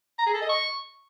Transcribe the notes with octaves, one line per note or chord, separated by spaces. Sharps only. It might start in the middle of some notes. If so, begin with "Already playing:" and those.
A#5
G#4
A4
D#5
C#6